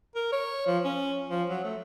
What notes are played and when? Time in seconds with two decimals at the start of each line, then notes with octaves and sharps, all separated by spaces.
0.15 A#4
0.32 C#5
0.67 F3
0.85 C#4
1.30 F3
1.49 F#3
1.64 A3